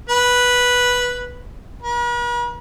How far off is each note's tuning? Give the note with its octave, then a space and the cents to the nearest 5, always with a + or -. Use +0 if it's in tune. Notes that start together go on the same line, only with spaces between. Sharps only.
B4 -5
B4 -45